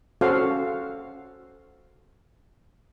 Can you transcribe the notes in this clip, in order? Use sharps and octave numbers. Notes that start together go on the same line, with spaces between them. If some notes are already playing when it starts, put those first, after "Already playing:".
C#4 F#4 A4 C5 F5